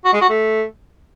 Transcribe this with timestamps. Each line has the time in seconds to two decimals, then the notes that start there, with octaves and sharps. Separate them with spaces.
0.05 F#4
0.13 G#3
0.21 F#4
0.29 A3